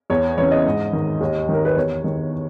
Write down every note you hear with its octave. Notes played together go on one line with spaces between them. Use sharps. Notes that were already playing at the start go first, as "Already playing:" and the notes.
E2 C#5
C#3 E3 C#5
D#5
G#2
D#3
D#2
D#3 A#4
B4
E2 C#5
D#3